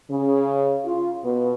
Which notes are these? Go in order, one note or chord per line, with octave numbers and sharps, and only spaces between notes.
C#3
F4
B2